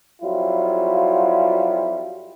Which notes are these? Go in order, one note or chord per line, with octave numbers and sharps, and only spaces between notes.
F2 F#3 G3 E4 F4